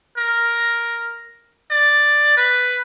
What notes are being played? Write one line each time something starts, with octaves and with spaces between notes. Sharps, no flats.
A#4
D5
B4